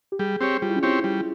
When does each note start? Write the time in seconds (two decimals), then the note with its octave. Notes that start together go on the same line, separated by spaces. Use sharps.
0.12 G4
0.19 G3 G#4
0.41 C4 G4 C#5
0.62 G3 F4
0.69 E4
0.76 C#4
0.83 C4 E4 G4 C#5
1.04 G3